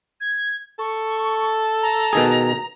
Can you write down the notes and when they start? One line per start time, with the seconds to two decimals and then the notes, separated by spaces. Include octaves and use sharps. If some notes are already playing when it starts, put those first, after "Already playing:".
0.21 G#6
0.79 A4 C#6
1.82 A#5
2.13 B2 D#3 G#4